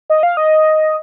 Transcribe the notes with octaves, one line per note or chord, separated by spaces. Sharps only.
D#5
F5
D#5